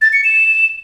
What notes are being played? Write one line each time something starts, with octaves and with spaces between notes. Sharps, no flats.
A6
C#7
E7